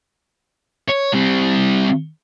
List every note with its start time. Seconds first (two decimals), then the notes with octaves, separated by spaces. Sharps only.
0.89 C#5
1.13 G3 C4